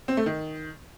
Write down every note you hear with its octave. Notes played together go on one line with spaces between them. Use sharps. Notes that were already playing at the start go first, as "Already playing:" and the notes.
C4
A3
D#3